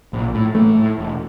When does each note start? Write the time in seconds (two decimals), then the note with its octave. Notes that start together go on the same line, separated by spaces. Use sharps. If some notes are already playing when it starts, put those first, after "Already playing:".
0.13 A#1
0.34 A2
0.55 A1 A3
0.76 A2
0.98 E1